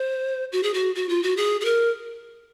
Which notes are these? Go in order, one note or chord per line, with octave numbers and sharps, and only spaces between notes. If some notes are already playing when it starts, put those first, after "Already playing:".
Already playing: C5
F#4
G#4
F#4
F#4
F4
F#4
G#4
G#4
A#4